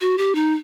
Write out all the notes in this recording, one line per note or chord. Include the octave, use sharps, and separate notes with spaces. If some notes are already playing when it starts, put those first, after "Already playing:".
F#4
G4
D#4